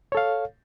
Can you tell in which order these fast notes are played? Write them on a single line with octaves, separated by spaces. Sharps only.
C#5 A4 F5